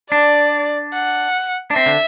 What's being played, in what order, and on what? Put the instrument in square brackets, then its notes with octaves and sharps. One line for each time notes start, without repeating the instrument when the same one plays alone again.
[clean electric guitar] D4 [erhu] D5
[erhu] F#5
[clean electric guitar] D4
[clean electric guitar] C4 [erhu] E5
[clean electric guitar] D3